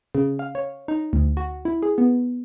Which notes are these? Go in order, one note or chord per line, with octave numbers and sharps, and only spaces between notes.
C#3
F5
C#5
D#4
D2
F#4
E4
G#4
B3